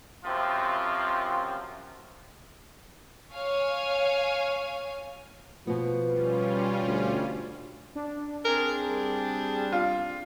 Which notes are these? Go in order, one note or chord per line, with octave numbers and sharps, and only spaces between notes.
F#2 C3 F3 C4 F4
C#5 F5 G#5
B2 F3 B3
G3 C#4 F4
D2
D4
C4 D4 G#4 A#4
G3
F4